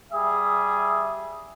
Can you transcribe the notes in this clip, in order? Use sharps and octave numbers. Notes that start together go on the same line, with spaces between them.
G3 G#4 E5 D#6